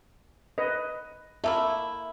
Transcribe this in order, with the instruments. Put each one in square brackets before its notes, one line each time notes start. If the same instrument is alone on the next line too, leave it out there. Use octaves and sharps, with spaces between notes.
[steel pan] B4 D#5
[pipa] A3 A#3 E4 [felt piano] E5